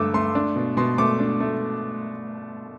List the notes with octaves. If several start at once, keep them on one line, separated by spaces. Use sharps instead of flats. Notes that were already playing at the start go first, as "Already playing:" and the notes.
Already playing: G2 D3 A3 D6 E6
A3 C6
D4
B2
B2 C6
A3 D6
D4
A3